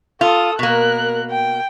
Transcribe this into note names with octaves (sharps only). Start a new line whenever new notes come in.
F4 A4 D#6
B2 A#3 A#4 F#6
G5